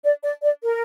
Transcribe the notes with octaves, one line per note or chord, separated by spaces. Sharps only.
D5
D5
D5
A#4